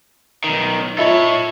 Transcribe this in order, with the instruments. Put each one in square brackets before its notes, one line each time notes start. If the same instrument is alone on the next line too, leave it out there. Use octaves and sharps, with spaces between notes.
[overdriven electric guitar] B1 D#3
[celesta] F4 D#5 E5 [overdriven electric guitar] A4 C#5